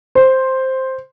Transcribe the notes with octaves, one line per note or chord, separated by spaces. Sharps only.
C5